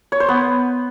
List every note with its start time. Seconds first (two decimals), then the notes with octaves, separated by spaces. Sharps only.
0.12 C#5
0.20 C5
0.28 B3